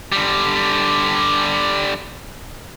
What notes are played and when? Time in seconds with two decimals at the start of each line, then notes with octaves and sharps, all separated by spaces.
0.12 D3 G3